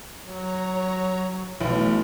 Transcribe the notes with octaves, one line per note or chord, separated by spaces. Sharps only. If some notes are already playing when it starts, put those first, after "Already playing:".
F#3 C#5 A#5
B1 E3 A3 B3